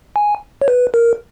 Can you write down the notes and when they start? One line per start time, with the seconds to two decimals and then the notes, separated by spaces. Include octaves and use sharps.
0.16 G#5
0.62 C#5
0.68 B4
0.94 A#4